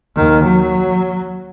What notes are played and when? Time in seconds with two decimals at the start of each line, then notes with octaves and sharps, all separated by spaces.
0.16 D#2 D#3
0.45 F#3